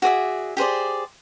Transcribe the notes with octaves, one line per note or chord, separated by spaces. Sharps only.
F#4 G#4 D5 E5
G4 G#4 C5 D5